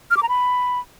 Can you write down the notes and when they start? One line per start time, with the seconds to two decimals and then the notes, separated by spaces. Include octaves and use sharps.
0.11 F6
0.17 D6
0.23 A#5
0.29 B5